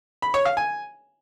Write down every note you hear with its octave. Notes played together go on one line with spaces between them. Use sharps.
B5
C#5
F5
G#5